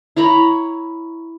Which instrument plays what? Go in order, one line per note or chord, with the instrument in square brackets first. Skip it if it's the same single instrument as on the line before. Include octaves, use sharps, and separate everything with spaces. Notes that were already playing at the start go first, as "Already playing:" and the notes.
[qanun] E4 C#5 A#5 B5